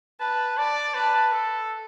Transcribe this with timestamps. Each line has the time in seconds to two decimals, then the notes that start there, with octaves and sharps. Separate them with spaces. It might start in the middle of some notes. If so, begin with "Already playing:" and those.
0.20 B4 A5
0.57 D5 A5
0.94 B4 A5
1.32 A4